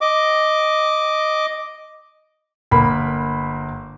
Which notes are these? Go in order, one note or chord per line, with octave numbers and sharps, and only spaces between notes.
D#5 D6
G1 A#3 B5